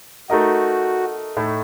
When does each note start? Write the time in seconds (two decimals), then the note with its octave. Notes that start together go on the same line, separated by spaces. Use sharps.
0.30 A3 D#4 F#4 A#4 D#5
1.37 A2 A3 D#4